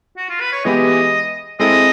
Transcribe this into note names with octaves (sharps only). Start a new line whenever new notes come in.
F#4
F4
B4
C#5
E3 G#3 B3 E4 G4 D#5
G#3 C4 E4 A4 D#5